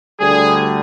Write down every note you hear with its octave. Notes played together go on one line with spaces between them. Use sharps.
D2 D3 G3 G#4